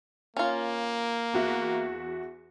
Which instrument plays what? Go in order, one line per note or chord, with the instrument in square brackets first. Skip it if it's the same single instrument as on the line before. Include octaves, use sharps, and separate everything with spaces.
[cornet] A#3 [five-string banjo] C#4 F4
[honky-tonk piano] E2 F#4 E5